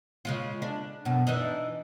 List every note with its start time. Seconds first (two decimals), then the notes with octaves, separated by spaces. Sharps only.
0.25 C#3 G#3 F4
0.62 D4
1.05 F#2 B2
1.27 E3 D4 D#4